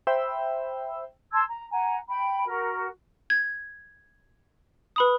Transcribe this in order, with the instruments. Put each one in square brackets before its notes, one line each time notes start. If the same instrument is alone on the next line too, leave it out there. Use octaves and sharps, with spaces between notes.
[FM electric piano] C5 E5 G5 B5 E6
[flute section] A5 C6 E6 G#6
A#5
F#5 G#5 A#5
G5 B5
F#4 A#4
[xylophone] G#6
B4 B5 D#6